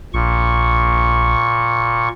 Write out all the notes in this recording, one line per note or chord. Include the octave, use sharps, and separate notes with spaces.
A#1 A#2 C#6